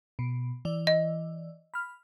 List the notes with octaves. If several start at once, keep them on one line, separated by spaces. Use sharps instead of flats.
B2
E3 D5
D#5
B5 F6